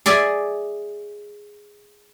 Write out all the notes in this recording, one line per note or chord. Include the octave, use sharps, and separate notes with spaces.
G#4 D5 E5 G#5